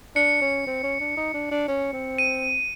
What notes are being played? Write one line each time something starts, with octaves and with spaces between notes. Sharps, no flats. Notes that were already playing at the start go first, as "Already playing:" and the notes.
D4 C#7
C#4
C4
C#4
D4
D#4
D4
D4
C#4
C4
D#7